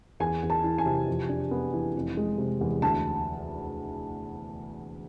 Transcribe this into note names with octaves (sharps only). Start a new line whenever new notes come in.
E2 G#5
E2
A5
E3
G#5
C3
F2
D4
B3
E3
F1
G#3
C3
E2
D2 A5